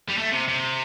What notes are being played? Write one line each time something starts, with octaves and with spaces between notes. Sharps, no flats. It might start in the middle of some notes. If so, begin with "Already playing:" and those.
G3
A3
C3
C3